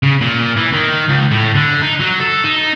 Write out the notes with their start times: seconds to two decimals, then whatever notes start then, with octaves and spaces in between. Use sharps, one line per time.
0.03 C#3
0.21 A#2
0.57 E3
0.73 D#3
1.08 C#2
1.31 A2
1.55 D3
1.82 D#4
2.00 F#3
2.20 A4
2.44 D#4